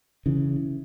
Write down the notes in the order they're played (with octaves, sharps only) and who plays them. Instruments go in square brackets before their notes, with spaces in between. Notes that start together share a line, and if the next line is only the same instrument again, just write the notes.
[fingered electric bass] C#3 E3